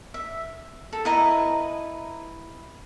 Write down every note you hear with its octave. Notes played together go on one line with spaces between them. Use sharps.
E5
A4
E4 B4 D#5 A#5